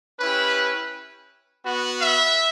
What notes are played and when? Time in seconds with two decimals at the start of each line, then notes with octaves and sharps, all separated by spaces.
0.20 C#4 E4 G4 B4
1.65 B3 F#4
2.01 E5